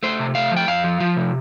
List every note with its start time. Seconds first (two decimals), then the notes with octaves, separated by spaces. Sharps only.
0.03 A3 C5
0.20 C3
0.35 A3 F5
0.52 F3 G5
0.67 F2 F5
0.84 F3
1.00 F3
1.16 C3